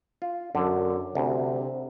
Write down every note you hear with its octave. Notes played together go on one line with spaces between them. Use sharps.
F4
F#2 D3
D2 C3